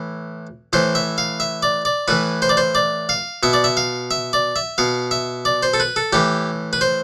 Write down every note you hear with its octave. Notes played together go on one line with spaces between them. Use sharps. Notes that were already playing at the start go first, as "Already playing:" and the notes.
Already playing: A2 E3
A2 E3 C5
E5
F5
E5
D5
D5
A2 E3 B4
C5
D5
C5
D5
F5
B2 E5
D5
E5
F5
E5
D5
E5
B2 F5
E5
D5
C5
A4
B4
A4
A2 E3 G4
B4
C5